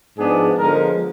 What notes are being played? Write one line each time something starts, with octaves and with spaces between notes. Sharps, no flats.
G#2 F3 B3 D4 G#4
D3 F3 G#3 B3 A#4